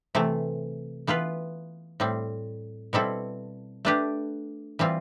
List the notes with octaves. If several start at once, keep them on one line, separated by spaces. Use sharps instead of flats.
C3 E3 A3
E3 B3 F4 B4
A2 G3 C4
B2 G3 C4 E4 A4
A3 D4 G4 B4
E3 G3 C4 F4